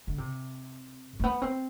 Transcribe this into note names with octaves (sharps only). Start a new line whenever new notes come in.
D3
C3
A3
B3
C4